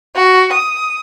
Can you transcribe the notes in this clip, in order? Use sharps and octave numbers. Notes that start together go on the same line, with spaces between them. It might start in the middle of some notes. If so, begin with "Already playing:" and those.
F#4
D#6